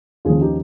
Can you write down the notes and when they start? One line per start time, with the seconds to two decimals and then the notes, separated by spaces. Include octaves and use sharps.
0.25 D#2 C#3 F3 F4 G#4
0.41 D#4 G4